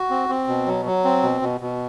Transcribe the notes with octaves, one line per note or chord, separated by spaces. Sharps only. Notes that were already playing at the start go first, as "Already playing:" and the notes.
Already playing: F#4
C4
C4
B2
F#3
F#3
C4
B2
B2
B2